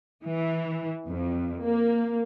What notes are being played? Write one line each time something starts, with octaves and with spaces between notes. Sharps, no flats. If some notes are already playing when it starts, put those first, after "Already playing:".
E3
F2
A#3